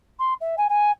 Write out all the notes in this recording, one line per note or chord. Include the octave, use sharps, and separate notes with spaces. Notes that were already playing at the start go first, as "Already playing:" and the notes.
C6
E5
G#5
G#5